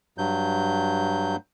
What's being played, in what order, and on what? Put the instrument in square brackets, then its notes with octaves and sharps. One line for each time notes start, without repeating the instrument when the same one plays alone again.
[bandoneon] G2 F#3 G6